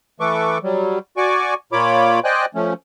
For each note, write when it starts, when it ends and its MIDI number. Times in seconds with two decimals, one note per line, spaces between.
0.20 0.58 52
0.20 0.58 57
0.20 0.58 69
0.20 0.58 71
0.20 0.58 85
0.20 0.58 86
0.63 0.99 54
0.63 0.99 55
1.17 1.54 66
1.17 1.54 74
1.17 1.54 80
1.17 1.54 85
1.17 1.54 86
1.72 2.20 46
1.72 2.20 58
1.72 2.20 65
1.72 2.20 73
1.72 2.20 83
1.72 2.20 86
2.24 2.45 72
2.24 2.45 74
2.24 2.45 75
2.24 2.45 79
2.24 2.45 80
2.24 2.45 90
2.55 2.74 53
2.55 2.74 57
2.55 2.74 61